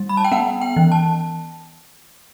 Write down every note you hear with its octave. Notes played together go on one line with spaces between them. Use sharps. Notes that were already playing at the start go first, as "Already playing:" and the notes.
Already playing: G3
B5
A5
G5
B3 F#5
G5
E3
A5